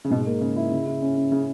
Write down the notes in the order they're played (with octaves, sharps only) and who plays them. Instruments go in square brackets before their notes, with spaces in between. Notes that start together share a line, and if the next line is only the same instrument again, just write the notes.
[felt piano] C#3
[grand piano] G#2 [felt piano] B2
[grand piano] A#3
[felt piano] C#3 [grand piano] A#3
[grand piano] E4
C#3
E4
C#4
C#4
[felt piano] C#3